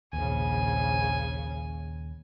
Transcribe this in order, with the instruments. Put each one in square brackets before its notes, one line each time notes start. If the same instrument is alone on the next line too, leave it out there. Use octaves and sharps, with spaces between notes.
[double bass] A#1 C#3 [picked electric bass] D#2 [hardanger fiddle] G#5